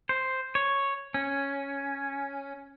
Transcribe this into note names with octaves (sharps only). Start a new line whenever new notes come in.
C5
C#5
C#4